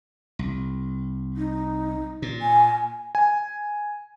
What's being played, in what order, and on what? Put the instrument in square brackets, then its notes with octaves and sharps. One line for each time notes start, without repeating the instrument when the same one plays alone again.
[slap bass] C2
[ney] D#4
[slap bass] A#2
[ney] G#5
[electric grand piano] G#5